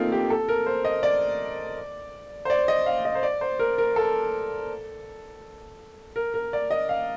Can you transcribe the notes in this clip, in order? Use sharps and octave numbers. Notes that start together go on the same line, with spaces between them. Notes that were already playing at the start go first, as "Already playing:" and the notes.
Already playing: A3 A#3 C4 D#4 F4
G4
A4
A#4
C5
D#5
D5
C5
D5
D#5
F5
D#5
C5
D5
C5
A#4
A#4
A4
A#4
A#4
D5
D#5
F5